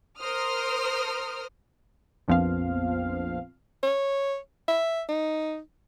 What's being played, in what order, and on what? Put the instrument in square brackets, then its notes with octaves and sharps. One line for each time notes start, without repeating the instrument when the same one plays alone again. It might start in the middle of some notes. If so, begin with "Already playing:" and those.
[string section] A#4 C5 D#6 F6
[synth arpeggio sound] A#1 F2 F3 B3 C4 F5
[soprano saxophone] C#5
E5
D#4